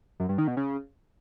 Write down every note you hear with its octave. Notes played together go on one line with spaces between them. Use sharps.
F#2
G2
D#3
B2
C#3